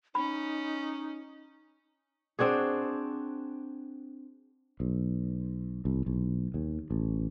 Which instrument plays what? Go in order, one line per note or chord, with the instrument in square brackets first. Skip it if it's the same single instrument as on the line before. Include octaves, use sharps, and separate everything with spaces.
[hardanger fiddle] C#4 [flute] D#4 [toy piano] B5
[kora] C4 D4 F#4 G#4
[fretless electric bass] B1
C2
B1
D#2
A1